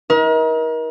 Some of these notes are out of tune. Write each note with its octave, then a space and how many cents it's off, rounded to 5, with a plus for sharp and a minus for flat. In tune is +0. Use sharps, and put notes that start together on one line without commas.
D#4 +40 A#4 +35